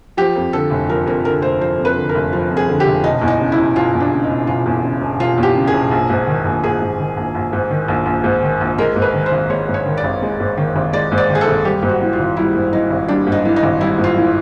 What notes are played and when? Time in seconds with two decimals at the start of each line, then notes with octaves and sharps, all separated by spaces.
0.17 F3 G4
0.35 F2
0.53 D3 A4
0.70 F1
0.89 F3 A#4
1.06 F2 A#4
1.25 D3 A#4
1.42 F1 C5
1.61 F3 C5
1.79 F2
1.85 B4
1.96 D3
2.09 A#4
2.15 F1
2.33 F3
2.50 F2
2.57 G#4
2.68 D3
2.80 G4
2.86 F1
3.04 E1 D#4
3.22 E2
3.28 D#4
3.40 C#3
3.52 E4
3.58 E1
3.76 E1 F4
3.94 E2
4.00 D4
4.11 C#3
4.23 D#4
4.30 E1
4.47 E1 F4
4.66 E2
4.83 C#3
5.01 E1
5.20 E1 F4
5.38 E2 G4
5.55 C#3
5.67 G#4
5.74 E1
5.91 A#1
6.10 G#2
6.27 D#3
6.45 A#1
6.63 A#1 G#4
6.81 G#2
6.99 D#3
7.17 A#1
7.35 A#1
7.53 G#2
7.71 D#3
7.88 A#1
8.06 A#1
8.24 G#2
8.42 D#3
8.61 A#1
8.78 G#3 A#4
8.96 G#2
9.02 B4
9.14 D#3
9.26 C5
9.32 G#1
9.50 G#3 C#5
9.68 G#2
9.74 C#5
9.86 D#3
9.97 D5
10.04 G#1
10.22 G#3
10.40 G#2
10.57 D#3
10.76 G#1
10.93 G#3 D5
11.12 G#2
11.18 D5
11.30 D#3
11.35 G#4
11.41 A4
11.48 G#1
11.65 G3 G4
11.82 G#2
11.89 F#4
12.01 E3
12.13 F4
12.19 G#1
12.36 G3 E4
12.55 G#2
12.73 E3 D#4
12.91 G#1
13.08 G3 D4
13.27 G#2
13.32 D#4
13.45 E3
13.56 D#4
13.63 G#1
13.81 G3 E4
13.98 G#2
14.04 F4
14.16 E3